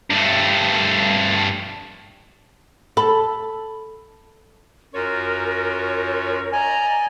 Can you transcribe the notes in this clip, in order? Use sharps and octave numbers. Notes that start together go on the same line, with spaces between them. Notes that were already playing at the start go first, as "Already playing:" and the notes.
G2 A3
A4 B5
F#2 F4 F#4 A#4 C#5
D5 D#5 G#5 A#5